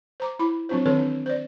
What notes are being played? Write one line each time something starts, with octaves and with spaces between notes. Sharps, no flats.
C5 A#5 D6
E4 B5 D6
F#3 C4 D4 F4 C5
D#3 E3 C4 A4 B4 C#5
D4
C5 D5